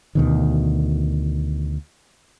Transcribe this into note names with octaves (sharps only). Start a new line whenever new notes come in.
D2 B2 D#3